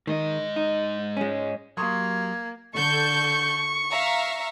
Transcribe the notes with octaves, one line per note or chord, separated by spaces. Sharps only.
G#2 D#3 D#5
D#4
G#3 C#4
F#3 A#3 G4 C6 C#6 D#6 G#6
D3 A4 C#6 G6
E5 F5 A#5